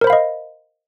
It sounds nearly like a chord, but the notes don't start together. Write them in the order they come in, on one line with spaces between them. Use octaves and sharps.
A#4 C5 B5 F5 D#5